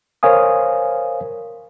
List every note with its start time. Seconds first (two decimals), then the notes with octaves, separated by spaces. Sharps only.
0.23 A#4 C5 C#5 F5 G#5 D#6